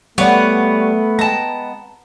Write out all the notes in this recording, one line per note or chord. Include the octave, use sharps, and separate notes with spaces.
G3 A3 B3 C#5 D5 F#5
G#3 G5 A5 A#5